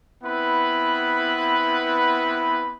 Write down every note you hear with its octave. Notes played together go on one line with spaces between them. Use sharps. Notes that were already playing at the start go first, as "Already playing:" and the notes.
B3 C4 E4 B4 F#5 B5